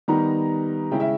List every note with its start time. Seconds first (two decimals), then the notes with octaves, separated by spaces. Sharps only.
0.08 D#3 G3 B3 D#4 A#5
0.91 C#3 G#3 C#4 E4 G5
1.00 E5